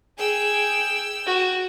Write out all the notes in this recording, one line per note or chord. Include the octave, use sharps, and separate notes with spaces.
G#4 G5 E6
F#4